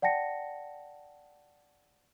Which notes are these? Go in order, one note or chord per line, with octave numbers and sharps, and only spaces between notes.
D5 F#5 G5 A5 A#6 C#7